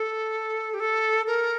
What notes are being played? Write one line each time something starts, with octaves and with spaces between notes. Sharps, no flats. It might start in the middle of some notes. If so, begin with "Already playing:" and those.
Already playing: A4
G4
A4
A#4